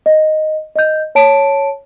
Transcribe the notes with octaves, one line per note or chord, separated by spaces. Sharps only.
D#5
D#5 G6
C#5 A5 D7